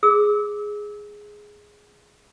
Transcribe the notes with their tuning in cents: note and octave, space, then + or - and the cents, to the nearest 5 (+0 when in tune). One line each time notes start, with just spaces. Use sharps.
G#4 +0 E6 -30